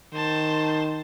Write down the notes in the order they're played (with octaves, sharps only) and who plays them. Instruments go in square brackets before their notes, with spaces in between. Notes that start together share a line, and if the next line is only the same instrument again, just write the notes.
[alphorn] D#3 [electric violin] C5 A5